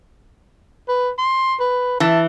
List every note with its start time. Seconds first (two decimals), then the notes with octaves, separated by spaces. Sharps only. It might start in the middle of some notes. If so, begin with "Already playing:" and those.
0.88 B4
1.18 C6
1.60 B4
2.00 E3 A5